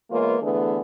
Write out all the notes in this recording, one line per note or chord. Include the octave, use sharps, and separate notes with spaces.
E3 G#3 A#3 B3 F4 C#5
D3 E3 A3 B3 D4 G#4